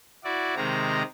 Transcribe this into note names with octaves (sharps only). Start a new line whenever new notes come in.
E4 F#4 D5
C3 D#3 G#3 C4 A#5